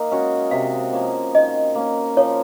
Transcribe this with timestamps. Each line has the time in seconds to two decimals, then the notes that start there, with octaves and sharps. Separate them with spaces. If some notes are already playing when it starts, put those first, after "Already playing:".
Already playing: A#3 D#4
0.11 G#3 C#4 F#4
0.51 C3 F5
0.93 F3 A#3 C#4
1.35 D#3 D#5
1.75 A#3 C#4
2.17 F3 C#5